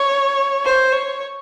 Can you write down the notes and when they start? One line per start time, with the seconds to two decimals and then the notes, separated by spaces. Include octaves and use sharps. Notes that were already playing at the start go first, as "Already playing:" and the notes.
Already playing: C#5
0.64 C5
0.92 C#5